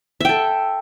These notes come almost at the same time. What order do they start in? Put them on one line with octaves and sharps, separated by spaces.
E5 G5 A4